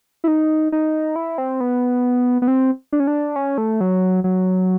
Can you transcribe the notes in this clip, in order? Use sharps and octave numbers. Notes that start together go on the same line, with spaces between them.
E4
D#4
D#4
E4
C4
B3
B3
C4
D4
C#4
D4
C#4
A3
F#3
F#3